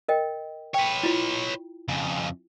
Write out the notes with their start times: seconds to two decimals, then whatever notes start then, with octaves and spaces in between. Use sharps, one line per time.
0.08 A#4 D#5 G5
0.74 B4 C#5 G5
1.03 E4 F4
1.89 F2 C#3